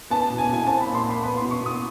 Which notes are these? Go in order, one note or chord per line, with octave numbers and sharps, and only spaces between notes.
B3 A5
B2
G#5
B2 G#5
C4 A5
B5
A#2
C6
A#2 B5
B3 B5
B2 C6
C#6
B2
D#6